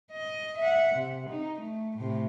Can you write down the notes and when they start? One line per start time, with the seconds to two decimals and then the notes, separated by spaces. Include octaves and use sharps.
0.12 D#5
0.59 E5 F#5
0.96 C3
1.31 D#4
1.61 A3
1.98 A2 C3